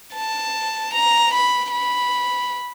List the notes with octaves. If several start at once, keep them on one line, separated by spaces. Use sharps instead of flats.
A5
A#5
B5
B5